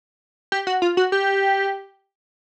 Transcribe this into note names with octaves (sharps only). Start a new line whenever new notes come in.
G4
F#4
F4
F#4
G4